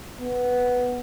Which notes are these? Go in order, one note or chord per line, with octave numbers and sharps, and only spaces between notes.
B3